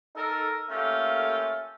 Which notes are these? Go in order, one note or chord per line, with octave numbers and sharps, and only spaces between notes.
D#4 A4 A#4
A3 A#3 C#4 F4 G4 A4